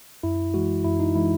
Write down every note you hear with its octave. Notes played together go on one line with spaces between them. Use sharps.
F#2 E4
E3 G#3 F#4
F#2 E4
D#4
E3 G#3 E4